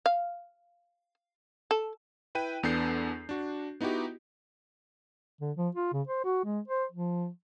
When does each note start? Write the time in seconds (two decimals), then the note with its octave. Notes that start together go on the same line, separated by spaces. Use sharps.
0.06 F5
1.71 A4
2.35 E4 B4 G5 D#7
2.63 E2 B3 D4 A4 G6 C7
3.29 D4 F#4
3.81 B3 D#4 E4 F#4 G4
5.41 D3
5.57 F3
5.75 F4
5.93 C#3
6.07 C5
6.24 F#4
6.45 G#3
6.68 C5
6.92 F3